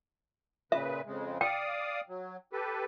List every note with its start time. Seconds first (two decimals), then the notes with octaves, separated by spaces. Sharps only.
0.72 A#2 C#3 B4 E5
1.06 F2 C#3 G#3
1.41 D5 F5 G5 D#6
2.09 F#3
2.53 G4 A4 B4